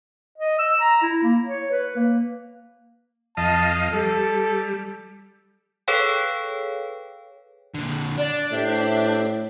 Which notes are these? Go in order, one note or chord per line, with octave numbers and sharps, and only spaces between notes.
D#5
E6
A#5
E4
A#3
C#5
B4
A#3
F2 D#5 F5 A5
G3 A4
G#4 A4 B4 C#5 F5 G5
A#2 D3
D4 D5
A2 G4 C5 E5